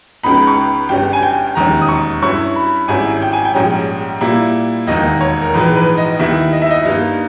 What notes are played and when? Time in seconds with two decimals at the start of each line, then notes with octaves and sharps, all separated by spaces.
0.23 C#2 C#3 G#3 B3 D#4 B5
0.47 C#6
0.57 B5
0.89 G1 G2 G3 C#4 G5
1.13 G#5
1.23 G5
1.55 E1 D#2 D#3 G3 C#4 A#5
1.82 D#6
1.88 C#6
2.22 G2 G3 C#4 E4 C#6
2.55 B5
2.88 G#1 G#2 G3 C#4 E4 G#5
3.22 G5
3.33 G#5
3.45 G5
3.54 A#1 G#2 G3 C#4
4.21 A#2 G3 A#3 E4
4.87 E1 D#2 D#3 A#3 D#4 D#5
5.21 C#5
5.42 A#4
5.54 A#1 G#2 E3 G#3 D#4 B4
5.76 B4
5.98 D#5
6.19 D#2 D#3 G3 B3 E4 E5
6.52 D#5
6.62 E5
6.71 D#5
6.85 G2 G3 A#3 D#4